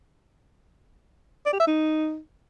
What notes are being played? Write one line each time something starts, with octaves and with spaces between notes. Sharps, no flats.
D5
G4
E5
D#4